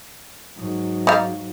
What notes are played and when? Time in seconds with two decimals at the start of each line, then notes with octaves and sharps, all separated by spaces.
0.56 G#2 F#3
1.07 D#4 D5 F5